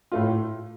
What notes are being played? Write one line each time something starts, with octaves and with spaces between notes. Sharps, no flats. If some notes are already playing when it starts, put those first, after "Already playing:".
A2 A3 F4